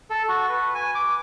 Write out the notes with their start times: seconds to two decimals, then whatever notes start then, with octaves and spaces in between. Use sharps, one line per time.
0.10 A4
0.28 F#4
0.49 B4
0.75 G#5
0.95 D6